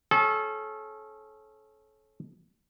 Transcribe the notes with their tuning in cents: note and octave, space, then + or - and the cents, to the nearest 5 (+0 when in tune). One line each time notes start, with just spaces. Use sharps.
C#4 -25 A4 -35